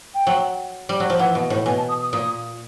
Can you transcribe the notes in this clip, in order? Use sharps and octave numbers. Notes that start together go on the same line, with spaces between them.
G5
F#3
G3
F#3
F3
E3 F#5
B2
A2
B2 G#5
A5
D#6
D#6
A#2 D#6